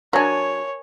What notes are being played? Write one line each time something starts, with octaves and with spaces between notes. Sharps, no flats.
F#3 D4 A#4 C#5 G#5 A5